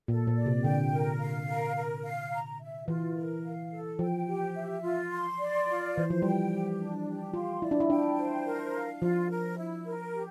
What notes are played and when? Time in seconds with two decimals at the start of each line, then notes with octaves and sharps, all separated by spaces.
0.08 A#2 A4
0.27 A#2
0.36 D5
0.46 C3
0.64 D3 G5
0.92 A#4
1.20 F5
1.48 A#4
1.76 A#4
2.04 F5
2.31 A#5
2.60 E5
2.88 E3 F4
3.16 A#4
3.44 F5
3.71 A4
3.99 F3 G5
4.27 G4
4.55 E5
4.83 F4
5.11 C6
5.39 D5
5.67 F4
5.95 E3 C5
6.10 F3
6.22 G3 G5
6.50 G4
6.79 D4
7.06 G4
7.34 F4 C6
7.62 E4 D5
7.71 D4
7.80 E4
7.89 D4 G5
8.18 C5
8.46 A#4
8.74 F5
9.01 F3 F4
9.30 A#4
9.57 E4
9.85 A#4
10.14 G4